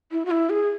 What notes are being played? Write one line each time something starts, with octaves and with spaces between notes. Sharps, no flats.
E4
F#4
E4
G#4